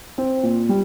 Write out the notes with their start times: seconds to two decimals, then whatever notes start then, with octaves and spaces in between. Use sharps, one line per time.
0.18 C4
0.43 A#2
0.69 G3